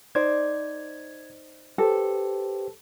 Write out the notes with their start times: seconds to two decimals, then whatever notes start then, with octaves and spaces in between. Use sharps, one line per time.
0.15 D#4 C5 D5 G#6
1.78 G4 A4 B4 C5